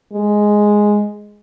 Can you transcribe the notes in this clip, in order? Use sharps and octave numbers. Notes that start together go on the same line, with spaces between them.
G#3